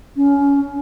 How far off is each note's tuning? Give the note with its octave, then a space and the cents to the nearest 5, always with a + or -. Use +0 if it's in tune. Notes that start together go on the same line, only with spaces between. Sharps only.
C#4 +20